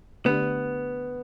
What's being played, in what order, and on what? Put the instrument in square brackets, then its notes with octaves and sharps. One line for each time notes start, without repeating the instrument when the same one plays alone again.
[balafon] D3 A3 D4 G4 D5 [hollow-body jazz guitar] B3